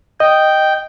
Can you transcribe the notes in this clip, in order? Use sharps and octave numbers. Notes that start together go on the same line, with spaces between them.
D#5 G5